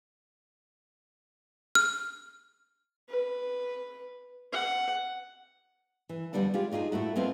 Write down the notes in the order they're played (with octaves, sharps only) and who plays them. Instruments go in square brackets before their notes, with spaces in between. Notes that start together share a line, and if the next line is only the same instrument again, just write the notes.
[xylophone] F6
[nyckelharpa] B4
F#5
[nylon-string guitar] E3
F2 A#2 D3 G3 B3 D4
G#3 F4 G4
D4 D#4 F4 G4 G#4
A2 A3 E4 F#4
G#3 B3 C4 F4